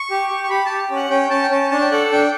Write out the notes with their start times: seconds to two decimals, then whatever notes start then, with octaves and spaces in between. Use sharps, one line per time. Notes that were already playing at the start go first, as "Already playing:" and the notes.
Already playing: C#6
0.10 G4
0.30 G4
0.43 C#6
0.50 G4 B5
0.66 A5
0.71 G4
0.90 C#4
0.96 F#5
1.10 C#4 G5
1.30 C#4 A5
1.42 G5
1.51 C#4 A5
1.71 D4 A5
1.81 G5
1.92 A4 F#5
2.12 D4 G5